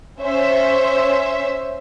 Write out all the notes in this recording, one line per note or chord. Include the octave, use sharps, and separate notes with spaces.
C#4 C5 E5